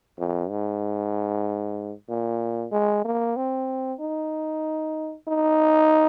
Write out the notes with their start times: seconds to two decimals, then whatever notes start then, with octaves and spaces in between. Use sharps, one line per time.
0.19 F2
0.50 G#2
2.09 A#2
2.72 G#3
3.05 A#3
3.36 C4
4.00 D#4
5.28 D#4